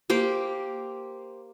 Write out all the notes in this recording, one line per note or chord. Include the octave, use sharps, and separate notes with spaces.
A#3 G4 C5